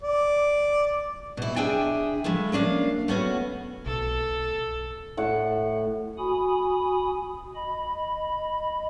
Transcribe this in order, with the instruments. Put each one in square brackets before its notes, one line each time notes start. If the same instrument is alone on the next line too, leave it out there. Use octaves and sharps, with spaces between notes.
[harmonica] D5
[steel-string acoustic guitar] B2 E4
D4 E4 G#4 E5 G5 G#5
F3 G#3 A3 E4
A#3 C#4 D4 F5
A3 B3 C#4 F#4
[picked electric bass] B1 [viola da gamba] A4
[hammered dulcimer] A2 F#5
[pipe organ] F#4 G#5 B5 D#6
D#5 B5